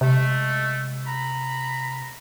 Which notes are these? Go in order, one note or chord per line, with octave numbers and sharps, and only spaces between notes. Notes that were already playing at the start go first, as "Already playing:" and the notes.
C3 G#3 A3
A#5 B5